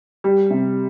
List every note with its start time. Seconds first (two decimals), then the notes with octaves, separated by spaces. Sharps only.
0.24 G3
0.50 C3